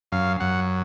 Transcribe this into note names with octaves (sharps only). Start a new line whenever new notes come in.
F#2 F5
F#2 F#5